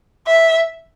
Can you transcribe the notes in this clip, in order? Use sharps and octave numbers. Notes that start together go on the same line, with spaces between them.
E5